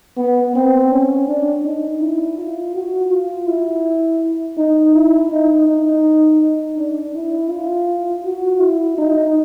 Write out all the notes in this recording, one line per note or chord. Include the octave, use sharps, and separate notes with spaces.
B3
C4
C#4
D4
D#4
E4
F4
F#4
F4
E4
D#4
E4
D#4
D#4
D#4
D4
E4
F4
F#4
E4
D#4